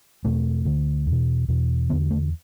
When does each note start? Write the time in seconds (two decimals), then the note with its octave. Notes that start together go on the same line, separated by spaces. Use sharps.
0.25 E2 B2 A3
0.65 D2 D3
1.07 E2 B2
1.48 E2 B2
1.90 D3 B3
1.93 E2
2.11 A3